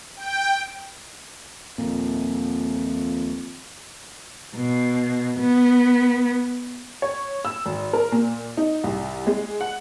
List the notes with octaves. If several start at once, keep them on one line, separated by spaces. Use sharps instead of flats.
G5
D#1 F2 A#2
B2
B3
C#5
E6
G#1
A#4
A#2
D#4
C2
G#3
F#5